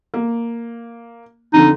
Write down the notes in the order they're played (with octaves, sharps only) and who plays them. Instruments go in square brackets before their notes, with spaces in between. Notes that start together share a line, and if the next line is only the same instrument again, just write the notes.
[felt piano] A#3
[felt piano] F2 D3 [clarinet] D#4